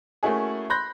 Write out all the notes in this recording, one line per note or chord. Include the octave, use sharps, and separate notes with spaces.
A3 A#3 C#4 E4 F#4 G#4
B5 C6 F#6 G6 A#6